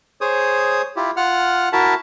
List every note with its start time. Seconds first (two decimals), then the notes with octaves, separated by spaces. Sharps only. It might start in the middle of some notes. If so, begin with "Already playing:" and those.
0.21 G#4 C5 C#5 D#6
0.96 E4 F4 G4
1.16 F4 F#5 F6
1.73 E4 F#4 A#4 E5 A5